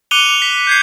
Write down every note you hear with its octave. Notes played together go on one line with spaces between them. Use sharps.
D6 F#6 C#7 D#7 F7 G7
B6
G6 G#6 C7